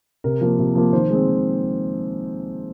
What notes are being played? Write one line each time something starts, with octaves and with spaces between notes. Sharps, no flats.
C3 A#4
F3 A#3
C3
F3 A#3
D#3 C5
G#3 C4
D#3